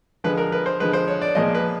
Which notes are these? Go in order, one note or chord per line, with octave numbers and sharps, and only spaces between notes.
D3 F3 G#3 B4
A#4
B4
C5
D3 F3 G#3 B4
C5
C#5
D5
A#2 F3 G#3 D#5
B4